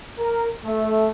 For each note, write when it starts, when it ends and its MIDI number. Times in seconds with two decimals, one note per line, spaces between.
0.19 0.48 70
0.66 1.07 57